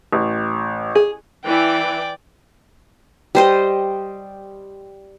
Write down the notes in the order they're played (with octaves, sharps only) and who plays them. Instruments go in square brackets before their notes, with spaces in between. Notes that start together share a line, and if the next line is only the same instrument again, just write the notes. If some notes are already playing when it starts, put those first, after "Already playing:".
[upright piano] A1
[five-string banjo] G#4
[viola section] E3 [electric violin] D5 G5
[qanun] G3 C5 D#5